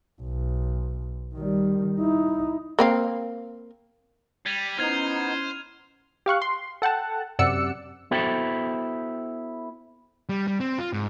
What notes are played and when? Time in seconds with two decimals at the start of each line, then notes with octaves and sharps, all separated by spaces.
0.20 B1
1.35 D#3 G3
2.00 D#4 E4
2.79 A#3 C4 F5
4.46 G3 G#6 D#7 F7
4.78 B3 C#4 D#4 E4 C5 F6 G#6 F7
6.26 G4 F5 C#6 F#6
6.42 C6
6.82 A4 F#5 G5 A5
7.39 F#2 C3 D5 F#5 E6 C#7
8.11 B3 E4 F#4 A4 C5 G5
10.29 G3
10.48 G3
10.60 C4
10.79 F4
10.93 G#2